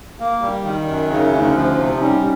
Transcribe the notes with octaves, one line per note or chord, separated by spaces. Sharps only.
A#3
G3
D#3
F#2
C#3 D#4
E4
D2 C#4 D#4
F3
C3
G3 C#4 D#4